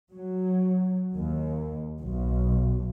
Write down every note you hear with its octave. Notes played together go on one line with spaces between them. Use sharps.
F#3
D#2
B1